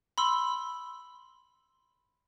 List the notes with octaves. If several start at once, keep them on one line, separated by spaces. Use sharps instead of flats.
B5 C6 E6